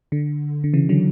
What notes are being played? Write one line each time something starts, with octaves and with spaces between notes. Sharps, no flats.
D3
D3
C#3 E3
D3 F#3